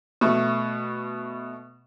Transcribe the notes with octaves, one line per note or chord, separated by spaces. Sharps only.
B2 A3